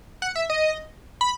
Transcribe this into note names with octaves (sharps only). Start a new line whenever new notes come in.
F#5
E5
D#5
B5